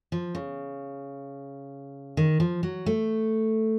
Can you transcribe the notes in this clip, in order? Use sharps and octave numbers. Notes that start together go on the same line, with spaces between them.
F3
C#3
D#3
F3
F#3
A3